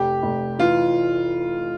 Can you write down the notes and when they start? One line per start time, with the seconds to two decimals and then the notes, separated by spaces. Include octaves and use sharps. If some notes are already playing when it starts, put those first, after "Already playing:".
Already playing: F1 G4
0.23 F1
0.59 E3 F4